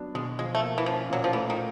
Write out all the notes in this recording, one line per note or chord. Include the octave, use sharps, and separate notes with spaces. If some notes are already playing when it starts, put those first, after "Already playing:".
Already playing: F#3 B3 D4
B2 G#3
F3 G#3
A3
A#3
E3
F3 C#4
A#2 F#3
F3
E3 A3
D#3